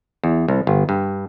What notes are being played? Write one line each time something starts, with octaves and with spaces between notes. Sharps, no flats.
E2
C2
G1
G2